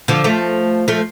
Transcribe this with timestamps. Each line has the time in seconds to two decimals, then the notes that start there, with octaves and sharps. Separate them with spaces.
0.08 D3 F3
0.24 F3 A3
0.88 F3 A3